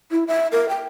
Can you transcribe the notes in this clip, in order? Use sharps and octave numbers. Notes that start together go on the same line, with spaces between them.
E4
E5
A#4
G5